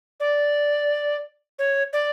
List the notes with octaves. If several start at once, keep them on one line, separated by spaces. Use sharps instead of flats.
D5
C#5
D5